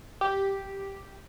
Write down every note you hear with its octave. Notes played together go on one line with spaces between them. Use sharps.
G4